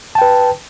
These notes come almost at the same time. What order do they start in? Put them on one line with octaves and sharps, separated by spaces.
A5 G5 B4